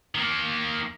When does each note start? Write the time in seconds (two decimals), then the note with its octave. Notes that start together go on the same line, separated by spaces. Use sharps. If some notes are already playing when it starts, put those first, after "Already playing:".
0.15 D#3 A#3